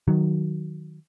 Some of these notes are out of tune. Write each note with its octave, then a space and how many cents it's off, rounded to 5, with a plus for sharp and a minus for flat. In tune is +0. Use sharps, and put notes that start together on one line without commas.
D#3 +0 F#3 +0